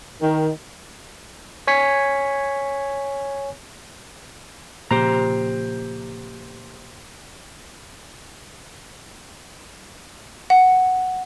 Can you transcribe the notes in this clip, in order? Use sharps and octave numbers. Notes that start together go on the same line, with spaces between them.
D#3
C#5 G#5 B6 C#7
A#2 C#3 F3 G4 C5 A#5
F#5